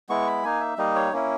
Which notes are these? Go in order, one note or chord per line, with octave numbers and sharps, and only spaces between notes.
G#3 B3 E4 C#6
B5
A#3 D#4 G#5
E5
G3 A#3 D#4 D#5
C#5
A#3 C#4 E4